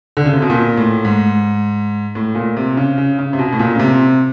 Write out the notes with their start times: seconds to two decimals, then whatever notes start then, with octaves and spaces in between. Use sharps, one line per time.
0.17 D3
0.25 C#3
0.33 C3
0.42 B2
0.50 A#2
0.77 A2
1.05 G#2
2.15 A2
2.35 A#2
2.57 C3
2.77 C#3
2.98 C#3
3.19 C#3
3.33 C3
3.39 B2
3.53 A2
3.59 A#2
3.75 C#3
3.79 C3